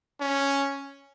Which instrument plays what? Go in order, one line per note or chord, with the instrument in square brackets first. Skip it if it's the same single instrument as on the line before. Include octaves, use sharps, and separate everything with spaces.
[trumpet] C#4